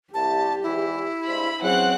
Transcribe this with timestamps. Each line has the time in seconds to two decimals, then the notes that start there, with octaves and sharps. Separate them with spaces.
0.14 C2 G4 A5
0.63 E2 G#2 E3 E4
1.27 G2 G#3 C5 B5
1.62 E3 F#3 C4 C#4 G#4 F#5 F#6